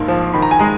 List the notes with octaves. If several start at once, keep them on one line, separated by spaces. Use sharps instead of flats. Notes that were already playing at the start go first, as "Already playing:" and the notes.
Already playing: A#1 G#2 A#3
F3
D#3 B5
A#5
G#5
G#3 A#5